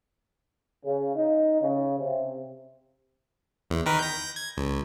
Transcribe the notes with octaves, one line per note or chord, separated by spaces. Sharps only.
C#3
D#4
C#3
C3
E2
D#3 A#4 B4
G6 A#6
G#6
C#2